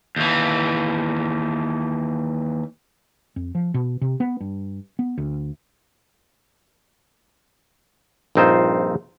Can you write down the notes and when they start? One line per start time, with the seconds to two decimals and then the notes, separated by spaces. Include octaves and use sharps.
0.16 D#2 E3
3.36 F2
3.55 F3
3.74 B2
4.01 C3
4.20 B3
4.41 G2
4.99 B3
5.18 D2
8.35 A#1 G2 C4 D#4 F4 C5